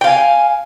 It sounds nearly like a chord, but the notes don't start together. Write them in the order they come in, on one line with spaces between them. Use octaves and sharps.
G5 F5 G#5